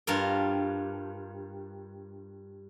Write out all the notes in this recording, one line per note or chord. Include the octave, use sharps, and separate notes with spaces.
G2 F4 A#4